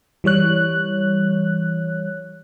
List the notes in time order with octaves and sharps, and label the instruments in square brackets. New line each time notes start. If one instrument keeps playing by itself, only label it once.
[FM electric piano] E3 G3 C#5 F#6